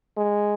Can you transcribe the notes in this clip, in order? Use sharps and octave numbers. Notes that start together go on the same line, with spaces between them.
G#3